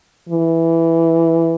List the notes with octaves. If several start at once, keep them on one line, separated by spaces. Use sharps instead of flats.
E3